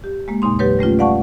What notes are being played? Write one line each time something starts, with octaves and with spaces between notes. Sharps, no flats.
G4
G#3 A#3
E2 A#2 C#3 D#4 C6
F#3 G4 B4 C#5
G3 A3 C#4 F4
D5 F5 F#5 A5 C#6